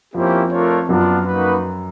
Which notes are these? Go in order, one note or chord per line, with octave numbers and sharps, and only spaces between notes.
F2 F3 A#3 C#4 E4 G4 C5
A3 D4 F4 A#4 C#5
F#2 F#3 B3 D4 F4
A#3 D#4 F#4 B4